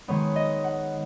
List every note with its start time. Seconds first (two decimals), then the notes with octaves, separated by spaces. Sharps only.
0.08 D#3 G#3 B3 C#5
0.36 D#5
0.64 F#5